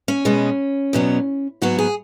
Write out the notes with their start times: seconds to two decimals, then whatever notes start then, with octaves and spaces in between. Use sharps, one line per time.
0.08 C#4
0.25 B2 G#3 B3
0.93 E2 B2 F#3 B3
1.62 G#2 F#3 B3 F#4
1.79 G#4